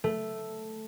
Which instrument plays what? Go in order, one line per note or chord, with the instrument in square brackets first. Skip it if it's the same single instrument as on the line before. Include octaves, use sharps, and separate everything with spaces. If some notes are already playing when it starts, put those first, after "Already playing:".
[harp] A3